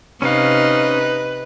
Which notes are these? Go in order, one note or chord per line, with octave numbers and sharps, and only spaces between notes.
C3 C#4 D#4 B4 F5